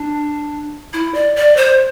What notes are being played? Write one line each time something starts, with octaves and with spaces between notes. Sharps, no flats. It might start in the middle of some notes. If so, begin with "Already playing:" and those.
Already playing: D4
E4
D5
D5
C5